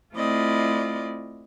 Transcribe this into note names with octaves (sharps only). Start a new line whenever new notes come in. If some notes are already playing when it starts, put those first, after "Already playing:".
A3 C4 E4 F4 D5 D#5